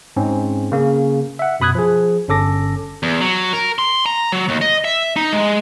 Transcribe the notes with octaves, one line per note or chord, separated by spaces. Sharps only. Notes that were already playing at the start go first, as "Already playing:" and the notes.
G#2 C4 C#4
C#3 A#3
E5 F#5
F#2 B2 B5 D#6 F#6 G#6
F3 G#4
G1 C#4 A4 D6 A#6
E2
F#3
A#4
C6
A#5
F#3
D#2
D#5
E5
D#4
G#3